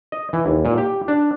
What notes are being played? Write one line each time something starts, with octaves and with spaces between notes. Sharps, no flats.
D#5
E3
D#2
A#2
G4
D4